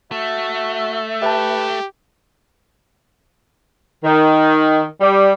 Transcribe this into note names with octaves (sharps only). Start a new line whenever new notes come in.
A3 F#4 E5
G4 B4 E5 A5
D#3
G3